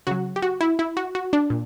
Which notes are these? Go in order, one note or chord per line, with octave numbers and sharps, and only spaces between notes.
C#3 F#3 F#4
G4
F#4
E4
E4
F#4
F#4
D4
A#2